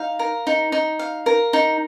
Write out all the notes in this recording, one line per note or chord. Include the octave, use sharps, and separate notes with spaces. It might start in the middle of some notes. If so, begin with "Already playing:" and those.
Already playing: D#4 F5
A#4
D#4
D#4
F5
A#4
D#4